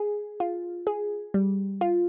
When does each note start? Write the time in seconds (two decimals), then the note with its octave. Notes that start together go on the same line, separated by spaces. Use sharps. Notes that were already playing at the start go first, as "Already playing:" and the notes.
Already playing: G#4
0.40 F4
0.87 G#4
1.34 G3
1.81 F4